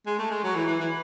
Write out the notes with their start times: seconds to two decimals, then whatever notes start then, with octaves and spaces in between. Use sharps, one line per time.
0.06 G#3
0.18 A3
0.31 G#3
0.44 F#3
0.55 E3
0.67 E3
0.80 E3